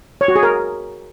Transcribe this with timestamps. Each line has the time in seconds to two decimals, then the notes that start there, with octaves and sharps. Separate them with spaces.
0.21 C#5
0.28 F#4
0.36 G#4
0.43 A#4